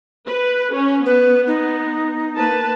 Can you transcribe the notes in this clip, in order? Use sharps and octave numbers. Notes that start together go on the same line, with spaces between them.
B4
C#4
B3 B4
D#4
A#3 B4 A5